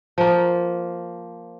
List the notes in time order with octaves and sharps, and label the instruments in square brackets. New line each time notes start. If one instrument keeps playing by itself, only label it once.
[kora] F3 A#3